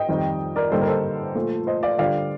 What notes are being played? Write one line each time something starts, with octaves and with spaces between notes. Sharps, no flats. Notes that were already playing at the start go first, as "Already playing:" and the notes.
Already playing: D#5 G5
F2 D#3 G3
A#4 D5
G2 D3 G3 A#3 D#4 A4 C5
A#4
A4 C5
A#2 F3 A3
C5 D#5
D5 F5
D3 G3 D4 F4 D5 F5